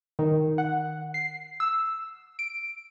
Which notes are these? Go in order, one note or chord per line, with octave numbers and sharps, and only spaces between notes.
D#3
F#5
C7
E6
D7